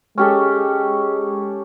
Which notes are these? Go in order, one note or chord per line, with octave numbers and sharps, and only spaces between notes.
G#3 C#4 G4 A4